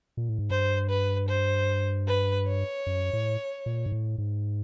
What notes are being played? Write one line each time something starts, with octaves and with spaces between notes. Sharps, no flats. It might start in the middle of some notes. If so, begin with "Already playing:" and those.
A#2
A2
G#2
G2 C5
B4
C5
B4
C#5
F#2
A2
A#2
G#2
A2
G#2